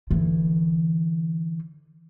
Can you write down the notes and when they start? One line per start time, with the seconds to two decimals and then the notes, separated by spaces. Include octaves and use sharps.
0.11 D3 E3